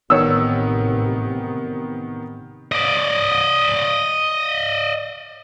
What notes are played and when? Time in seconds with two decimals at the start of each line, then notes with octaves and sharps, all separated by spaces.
0.10 A1 C3 D#3 B3 C#5 E6
2.72 D5 D#5